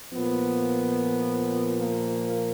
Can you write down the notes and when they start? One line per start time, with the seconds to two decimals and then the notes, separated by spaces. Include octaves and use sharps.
0.13 A#2 F3 B3
1.79 A#3